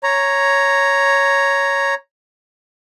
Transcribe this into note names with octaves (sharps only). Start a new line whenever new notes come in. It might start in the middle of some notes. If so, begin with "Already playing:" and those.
C#5 A#5